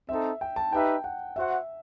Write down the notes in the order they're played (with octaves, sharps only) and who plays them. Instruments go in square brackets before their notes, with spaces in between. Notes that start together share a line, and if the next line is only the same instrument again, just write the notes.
[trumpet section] C4 D#4 A4 [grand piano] E5
[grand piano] G5
A5
[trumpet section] D#4 G4 B4 E5 [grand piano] G5
[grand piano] F#5
[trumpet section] F#4 C5 F#5 [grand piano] E5